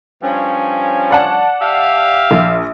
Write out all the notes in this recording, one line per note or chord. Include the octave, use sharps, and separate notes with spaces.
G2 F3 C#4
D5 F#5 A5
G4 E5 F5
A#1